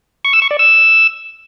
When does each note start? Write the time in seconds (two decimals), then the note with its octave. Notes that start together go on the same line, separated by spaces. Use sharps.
0.25 C#6
0.33 E6
0.42 C#6
0.51 D5
0.59 E6